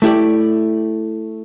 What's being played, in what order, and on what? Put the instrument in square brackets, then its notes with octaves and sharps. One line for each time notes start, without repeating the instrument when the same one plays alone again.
[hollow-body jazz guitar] A3 E4 G4 D5